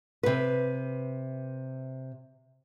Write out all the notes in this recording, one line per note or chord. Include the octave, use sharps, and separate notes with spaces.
C3 B4